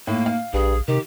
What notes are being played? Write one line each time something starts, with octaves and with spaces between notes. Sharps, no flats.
A2 A#3
F5
A#1 G2 G#4
C3 D#3 G4